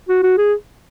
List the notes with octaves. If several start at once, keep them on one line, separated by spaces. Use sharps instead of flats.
F#4
F#4
G#4